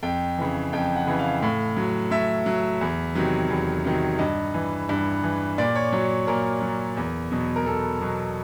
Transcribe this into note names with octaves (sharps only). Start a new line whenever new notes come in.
F2 G5
C#3 E3
F2 G5
F#5
C#3 E3
F5
A2
F#3
A2 E5
F#3
E2
C3 D#3 F#3
E2
C3 D#3 F#3
G2 D#5
E3
G2
E3
A#2 D5
C#5
F#3 C#5
A#2 A#4
F#3
E2
B2 F#3
A#4
E2 A4
B2 F#3